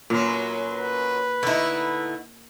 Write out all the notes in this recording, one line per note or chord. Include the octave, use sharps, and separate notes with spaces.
F#2 A#2 F#3 B3
B4
D3 A3 D#4 E4